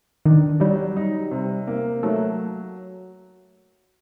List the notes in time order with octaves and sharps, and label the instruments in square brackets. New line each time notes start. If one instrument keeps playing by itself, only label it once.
[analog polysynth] D#3 [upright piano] D4
[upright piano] F#3 [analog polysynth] G3
[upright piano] D#4
C3
A#3
[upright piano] F#3 [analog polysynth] A3